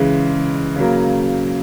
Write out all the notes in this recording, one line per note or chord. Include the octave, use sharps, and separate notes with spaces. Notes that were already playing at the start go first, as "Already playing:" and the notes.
Already playing: C#3 E3 G#3
C#3 F#3 A#3